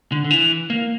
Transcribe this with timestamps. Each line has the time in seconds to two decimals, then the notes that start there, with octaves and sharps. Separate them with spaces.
0.12 D3
0.24 D3
0.30 E3
0.70 A#3